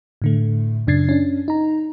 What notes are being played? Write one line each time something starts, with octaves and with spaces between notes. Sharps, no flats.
A2 D3 A3
F#2 C#3 D4 G#6 A6 C7
C#4 D4
D#4 A#5